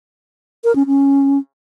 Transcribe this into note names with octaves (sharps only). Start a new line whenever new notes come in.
A#4
C#4
C#4